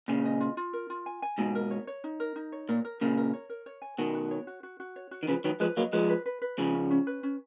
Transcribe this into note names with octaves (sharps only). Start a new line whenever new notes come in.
A#2 C#3 G#5
D#5
F4
F4
A#4
F4
G#5
G#5
G#2 B2 D#4
A#4
C#5
C#5
D#4
A#4
D#4
C#5
A#2 A#4
A#4
A#2 C#3 A#4
A#4
C#5
A#4
C#5
G#5
B2 D#3 F#5
F#4
C#5
F#4
F#4
F#4
C#5
F#4
D#3
C#3 F3 B4
D#3 F#3 B4
F3 G#3 B4
F#3 A#3 D#5
F3 G#3 B4
B4
B4
B4
C#3 F3 C#4
C#4
C#4
B4
C#4